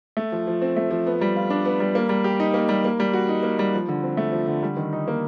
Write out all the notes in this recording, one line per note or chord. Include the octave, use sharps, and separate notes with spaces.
A3
F3
F3
C4
A3
F3
B3
G3
F4
D4
B3
G3
A#3
G3
G4
D#4
A#3
G3
A#3
G3
F#4
D#4
A#3
G3
F3
D3
C4
A3
F3
D3
G3
D#3
D#4
A#3